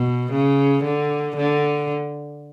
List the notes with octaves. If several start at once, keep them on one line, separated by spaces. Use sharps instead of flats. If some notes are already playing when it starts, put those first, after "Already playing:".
Already playing: B2
C#3
D3
D3